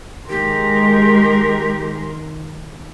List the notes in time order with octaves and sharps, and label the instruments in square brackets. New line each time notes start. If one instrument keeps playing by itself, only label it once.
[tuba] D#3 [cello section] G#3 [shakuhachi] G4 [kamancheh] A#4 C6